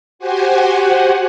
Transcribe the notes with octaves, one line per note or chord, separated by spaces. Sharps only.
F#4 G4 C5 F#5 G#5